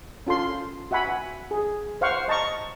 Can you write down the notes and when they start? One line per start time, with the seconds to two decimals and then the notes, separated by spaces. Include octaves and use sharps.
0.27 C#4 F4 A4 C6
0.91 F#4 E5 F#5 G#5 B5
1.51 G#4
2.01 C5 F5 F#5 C#6
2.28 D#5 A5 A#5 C#6